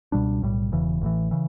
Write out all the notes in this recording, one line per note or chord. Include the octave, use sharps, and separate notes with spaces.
C#2 B2 G3 D4
B1 A2 G3
E1 E2 C#3 E3
A1 A2 E3
C#3 E3